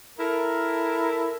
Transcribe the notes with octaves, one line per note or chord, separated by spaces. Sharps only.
E4 A4 A#4